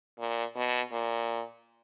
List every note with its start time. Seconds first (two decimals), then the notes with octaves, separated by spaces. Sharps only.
0.19 A#2
0.56 B2
0.92 A#2